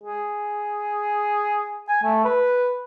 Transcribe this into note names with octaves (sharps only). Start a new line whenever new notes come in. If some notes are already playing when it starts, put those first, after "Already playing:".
G#4
G#5
A3
B4